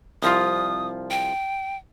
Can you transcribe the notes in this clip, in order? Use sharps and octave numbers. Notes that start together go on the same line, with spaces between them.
C2 F3 F4 D#6
G5